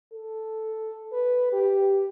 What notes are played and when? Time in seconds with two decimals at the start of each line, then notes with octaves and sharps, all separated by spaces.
0.12 A4
1.12 B4
1.52 G4